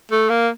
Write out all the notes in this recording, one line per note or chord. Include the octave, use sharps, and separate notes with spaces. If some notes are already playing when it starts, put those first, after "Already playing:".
A3
A#3